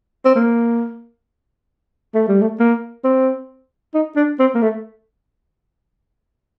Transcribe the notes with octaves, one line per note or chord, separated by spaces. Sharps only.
C4
A#3
A3
G3
A3
A#3
C4
D#4
D4
C4
A#3
A3